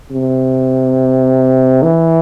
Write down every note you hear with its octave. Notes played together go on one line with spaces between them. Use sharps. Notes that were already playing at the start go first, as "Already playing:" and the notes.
C3
E3